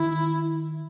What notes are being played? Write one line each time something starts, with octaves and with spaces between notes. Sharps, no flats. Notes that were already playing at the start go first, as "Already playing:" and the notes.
Already playing: D#3 E4